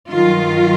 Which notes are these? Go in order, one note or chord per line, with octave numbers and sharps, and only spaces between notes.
G2 D#3 F#3 F4